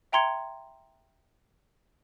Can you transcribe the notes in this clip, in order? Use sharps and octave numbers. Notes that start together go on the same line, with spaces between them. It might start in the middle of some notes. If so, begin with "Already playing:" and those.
E5 G5 A#5 C6 G#6 C#7